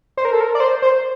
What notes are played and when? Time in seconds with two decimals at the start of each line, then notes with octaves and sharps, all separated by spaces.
0.17 C5
0.25 A#4
0.32 A4
0.41 A#4
0.55 D5
0.60 C5
0.82 C5